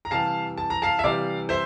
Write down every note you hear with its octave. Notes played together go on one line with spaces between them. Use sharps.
A#5
C3 E3 G3 F5 A5
A5
A#5
F5 A5
E5
C3 E3 G3 D5 F5
C5 E5